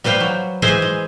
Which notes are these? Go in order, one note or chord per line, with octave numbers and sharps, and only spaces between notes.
G3 B4 C5 F5 G5
F#3
E3 G#3 G#4 B4 C5 E5
G#3